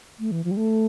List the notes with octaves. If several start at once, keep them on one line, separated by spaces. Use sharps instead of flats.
A3
E3
F3
G3
A3